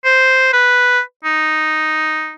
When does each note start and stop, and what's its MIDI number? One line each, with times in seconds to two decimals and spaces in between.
0.05 0.51 72
0.53 1.00 71
1.24 2.35 63